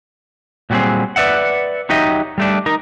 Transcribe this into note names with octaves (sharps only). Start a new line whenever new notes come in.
A#2 F#3 G3 A3 C4 G#4
B4 D5 E5 F#5
F#3 D#4 G4 D#5 E5
G3 A3 D4
D#4 A#4